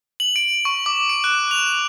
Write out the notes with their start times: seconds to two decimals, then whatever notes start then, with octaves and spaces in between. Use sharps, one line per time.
0.20 F#7
0.36 D7
0.65 C#6
0.86 D6
1.09 D7
1.24 F#6
1.51 F7
1.72 F7